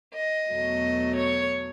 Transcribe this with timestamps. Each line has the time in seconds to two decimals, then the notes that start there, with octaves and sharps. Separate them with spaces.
0.15 D#5
0.49 E2 B2 F#3 A3
1.16 C#5